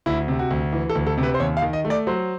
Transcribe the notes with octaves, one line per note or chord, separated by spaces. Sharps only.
D2 E4
C3
F#4
D2
E3
A4
D2
A4
C3
B4
C5
D#2 C#5
F5
D#3
D#5
A3
D5
F#3 C5